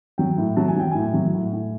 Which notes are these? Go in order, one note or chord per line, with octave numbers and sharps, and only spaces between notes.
F#3 G5
A2
F#3 A5
G#5
F#3 G5
A2 G#5
F#3
A2
A2